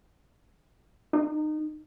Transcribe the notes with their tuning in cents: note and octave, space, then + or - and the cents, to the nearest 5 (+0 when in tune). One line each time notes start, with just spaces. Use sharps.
D#4 -25